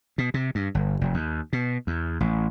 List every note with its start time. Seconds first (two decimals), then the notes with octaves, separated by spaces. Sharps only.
0.18 B2
0.34 C3
0.55 G2
0.75 G1
1.01 F1
1.14 D#2
1.53 B2
1.87 E2
2.20 A1